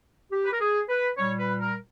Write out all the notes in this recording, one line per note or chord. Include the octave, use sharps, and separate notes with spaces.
G4
B4
A#4
G#4
B4
A#2 G3 C#5
B4
A#4